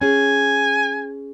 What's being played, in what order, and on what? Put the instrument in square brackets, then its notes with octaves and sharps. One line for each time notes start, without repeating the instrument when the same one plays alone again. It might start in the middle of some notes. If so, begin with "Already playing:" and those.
[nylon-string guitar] C#4 G#4 [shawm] G#5